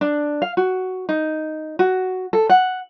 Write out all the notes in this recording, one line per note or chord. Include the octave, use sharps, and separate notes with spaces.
D4
F5
F#4
D#4
F#4
A4
F#5